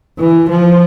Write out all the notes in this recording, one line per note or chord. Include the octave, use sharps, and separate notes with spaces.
E3
F3